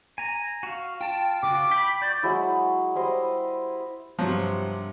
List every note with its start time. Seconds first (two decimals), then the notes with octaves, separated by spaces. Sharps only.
0.18 G#5 A#5
0.63 F#4 F5
1.01 F4 G5 A5
1.43 C#3 F4 F#4 D6
1.71 G5 B5 B6
2.02 F#4 D5 G6
2.23 F#3 G#3 E4
2.95 G3 E4 C5 D#5
4.19 G2 C3 F3 F#3